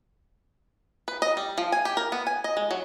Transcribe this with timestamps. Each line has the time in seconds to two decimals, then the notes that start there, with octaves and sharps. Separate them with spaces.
1.08 B4
1.22 D#5
1.37 G3
1.58 F3
1.72 G#5
1.85 G4
1.97 A#4
2.12 B3
2.27 G#5
2.44 D#5
2.57 G#3
2.71 F#3